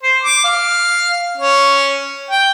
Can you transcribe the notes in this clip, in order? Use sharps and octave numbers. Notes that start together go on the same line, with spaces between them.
C5
D6
F5
C#4
G5